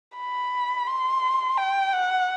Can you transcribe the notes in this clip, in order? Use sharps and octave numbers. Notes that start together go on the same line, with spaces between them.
B5
C6
G5
F#5